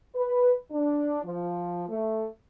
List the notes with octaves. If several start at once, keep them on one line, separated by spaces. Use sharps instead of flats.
B4
D4
F3
A3